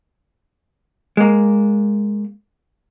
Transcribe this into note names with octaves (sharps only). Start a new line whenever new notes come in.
G#3 A#3